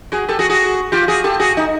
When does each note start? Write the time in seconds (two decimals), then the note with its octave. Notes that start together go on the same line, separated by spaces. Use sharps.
0.12 F#4 G#4
0.28 G4 A4
0.39 F#4 G#4
0.50 F#4 G#4
0.92 F4 G4
1.08 F#4 G#4
1.24 G4 A4
1.40 F#4 G#4
1.57 D#4